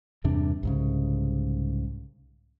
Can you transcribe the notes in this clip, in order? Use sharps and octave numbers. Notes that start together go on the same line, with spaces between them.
E2 G2 C3 D4
C2 G#2 C#3